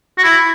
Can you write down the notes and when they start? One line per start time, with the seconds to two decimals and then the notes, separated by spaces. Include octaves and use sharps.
0.18 F#4
0.23 E4